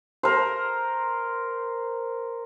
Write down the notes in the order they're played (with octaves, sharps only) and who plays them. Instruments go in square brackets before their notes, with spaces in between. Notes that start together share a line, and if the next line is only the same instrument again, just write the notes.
[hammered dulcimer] A#4 C5